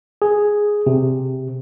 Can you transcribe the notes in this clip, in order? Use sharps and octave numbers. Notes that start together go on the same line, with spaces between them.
G#4
C3